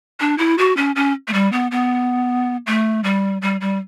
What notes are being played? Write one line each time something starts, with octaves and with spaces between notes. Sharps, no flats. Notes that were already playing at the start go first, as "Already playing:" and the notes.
D4
E4
F#4
C#4
C#4
A3
G3
B3
B3
A3
G3
G3
G3